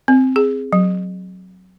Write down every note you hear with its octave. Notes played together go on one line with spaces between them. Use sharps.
C4
G#4
F#3